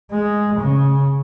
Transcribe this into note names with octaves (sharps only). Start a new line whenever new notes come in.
G#3
C#3